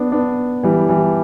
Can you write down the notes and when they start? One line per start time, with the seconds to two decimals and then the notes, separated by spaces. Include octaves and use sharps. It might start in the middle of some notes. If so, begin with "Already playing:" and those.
Already playing: B3 D4
0.12 B3 D4
0.63 E3 G3
0.89 E3 G3